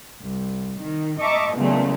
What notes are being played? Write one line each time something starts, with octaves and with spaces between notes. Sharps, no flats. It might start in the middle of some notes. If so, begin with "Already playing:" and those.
C2
D#3
D#5 E5 A5 A#5 C#6 D6
E2 A#2 C#3 F#3 G#3 A3